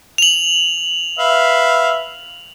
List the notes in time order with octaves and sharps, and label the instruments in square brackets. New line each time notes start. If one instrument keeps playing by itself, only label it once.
[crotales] F7 F#7
[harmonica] B4 E5 F5